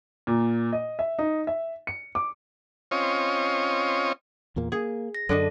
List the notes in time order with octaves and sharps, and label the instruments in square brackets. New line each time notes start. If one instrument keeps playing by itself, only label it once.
[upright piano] A#2
D#5
E5
D#4
E5
C#7
D6
[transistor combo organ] C4 C#4 F4 C#5 D#5
[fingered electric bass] E2 A#2 A#3
[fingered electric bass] A#3 [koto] G#4
[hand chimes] A#6
[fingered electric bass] F#2 [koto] D3 D4 D#5 [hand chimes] A4 D5